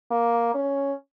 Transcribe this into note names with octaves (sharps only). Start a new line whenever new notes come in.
A#3
C#4